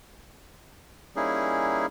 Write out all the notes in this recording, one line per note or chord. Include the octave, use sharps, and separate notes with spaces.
G3 A#3 C#4 D#4 E4 G#4